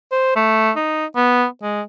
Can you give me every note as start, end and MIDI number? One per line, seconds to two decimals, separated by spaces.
0.12 0.33 72
0.36 0.71 57
0.76 1.06 63
1.16 1.45 59
1.63 1.82 56